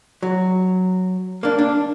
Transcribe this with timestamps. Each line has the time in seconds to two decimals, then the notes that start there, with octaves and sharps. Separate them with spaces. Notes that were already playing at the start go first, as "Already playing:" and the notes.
0.23 F#3
1.43 A#3 D4
1.59 D4